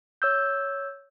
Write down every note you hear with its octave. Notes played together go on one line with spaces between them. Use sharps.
C#5 E6 G6